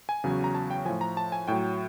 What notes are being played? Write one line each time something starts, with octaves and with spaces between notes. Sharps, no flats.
G#5
E2 C#3 F#3
A#5
A5
G5
A2 F3 G#5
A#5
A5
G#5
A2 F#3 G5